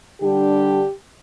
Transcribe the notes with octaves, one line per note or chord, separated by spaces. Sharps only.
D3 G3 D4 G4